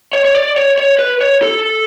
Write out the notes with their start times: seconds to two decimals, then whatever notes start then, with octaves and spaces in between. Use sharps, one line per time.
0.13 C#5
0.25 C#5
0.35 D5
0.57 C#5
0.78 C#5
0.99 B4
1.21 C#5
1.42 A4